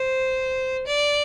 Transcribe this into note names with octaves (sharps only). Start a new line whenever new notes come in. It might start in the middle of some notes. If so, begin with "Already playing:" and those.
Already playing: C5
D5